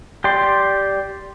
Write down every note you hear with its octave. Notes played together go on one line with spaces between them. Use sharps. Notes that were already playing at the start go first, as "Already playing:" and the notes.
G4 D5 C6